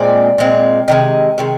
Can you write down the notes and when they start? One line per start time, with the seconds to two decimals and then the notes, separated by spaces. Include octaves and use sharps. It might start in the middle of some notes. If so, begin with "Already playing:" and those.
Already playing: A#2 G#3 C4 D5
0.38 A#2 G#3 C4
0.88 C3 D#3 G#3 D#5
1.38 C3 D#3 G#3